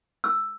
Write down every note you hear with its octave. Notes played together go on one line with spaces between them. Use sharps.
E6